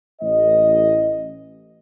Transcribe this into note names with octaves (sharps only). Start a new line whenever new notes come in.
A1 D#5